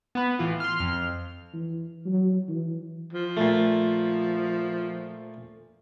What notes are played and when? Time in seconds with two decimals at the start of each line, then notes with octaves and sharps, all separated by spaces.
0.15 B3 B4
0.39 A2 E3 F4
0.60 C6 F6
0.79 F2 F6
1.53 E3
2.06 F#3
2.48 E3
3.13 F3
3.37 A#2 A3